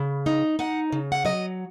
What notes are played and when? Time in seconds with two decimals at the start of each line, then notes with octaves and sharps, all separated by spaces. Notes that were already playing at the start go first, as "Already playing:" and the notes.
Already playing: C#3
0.26 D#4
0.59 D#4 F#5
0.92 C#3
1.12 F#5
1.25 F#3 D#5